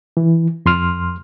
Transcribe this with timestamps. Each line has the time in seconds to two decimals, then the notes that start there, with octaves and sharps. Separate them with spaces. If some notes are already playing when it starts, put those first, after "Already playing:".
0.17 E3
0.66 F2 C6 F6